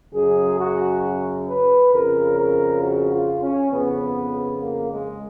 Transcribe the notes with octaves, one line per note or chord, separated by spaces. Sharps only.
F#2 C#3 G#4
F#4
B4
F2 C#3 A#4
A#4
F#4
F4
C#4
F2 C#3 B3
A#3
G#3